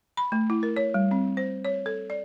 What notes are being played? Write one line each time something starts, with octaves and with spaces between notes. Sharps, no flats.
B5
A3
E4
A#4
C#5
G3
C4
C5
C#5
A4
D5